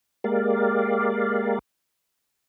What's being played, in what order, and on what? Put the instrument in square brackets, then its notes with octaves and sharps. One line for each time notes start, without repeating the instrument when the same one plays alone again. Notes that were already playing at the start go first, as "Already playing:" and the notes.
[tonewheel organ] G#3 A#3 G4 A#4 D5 F5